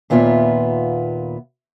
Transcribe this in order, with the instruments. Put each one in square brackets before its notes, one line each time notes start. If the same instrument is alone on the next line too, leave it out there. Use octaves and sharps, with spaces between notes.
[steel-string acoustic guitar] D#2 A#2 B3 F4 E5